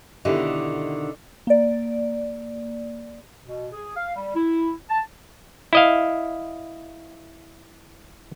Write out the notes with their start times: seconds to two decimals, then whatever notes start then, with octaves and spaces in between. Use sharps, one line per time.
0.25 B2 D3 D#3 E4 G4 D#5
1.47 A#3 D5
3.45 B2
3.72 G#4
3.95 F5
4.15 G3
4.34 E4
4.89 A5
5.73 E4 D#5 F5